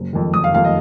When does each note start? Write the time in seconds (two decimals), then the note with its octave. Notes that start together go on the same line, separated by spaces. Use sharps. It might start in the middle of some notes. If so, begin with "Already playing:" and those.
Already playing: F#1
0.13 F2 D#3
0.34 F#1 D#6
0.44 F5
0.54 F2 D#3 F5
0.64 D#5